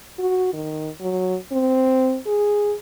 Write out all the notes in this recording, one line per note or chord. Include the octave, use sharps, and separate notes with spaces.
F#4
D#3
F#3
C4
G#4